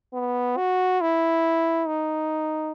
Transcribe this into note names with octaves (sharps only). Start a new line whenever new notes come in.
B3
F#4
E4
D#4